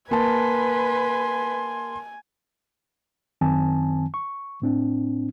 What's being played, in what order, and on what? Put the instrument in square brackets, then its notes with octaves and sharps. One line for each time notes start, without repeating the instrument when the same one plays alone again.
[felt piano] A#3 A5 [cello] B4 [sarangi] G#5 [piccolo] C6
[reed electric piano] F#2 D#3 C4 G#5 A5
C#6
A2 C4 D4